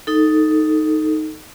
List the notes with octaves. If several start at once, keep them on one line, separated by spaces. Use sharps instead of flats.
D#4 A4